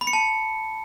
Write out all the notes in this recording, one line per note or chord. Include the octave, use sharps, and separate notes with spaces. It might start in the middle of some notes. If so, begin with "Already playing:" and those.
B5
C#7
A5